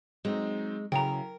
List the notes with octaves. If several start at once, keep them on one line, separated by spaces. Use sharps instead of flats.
F#3 G#3 C4 D#4
C#3 F#3 E4 A#4 G5 A#5